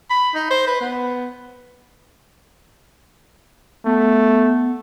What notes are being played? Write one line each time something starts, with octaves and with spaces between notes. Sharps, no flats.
B5
D#4
C5
B4
B3
A3 B3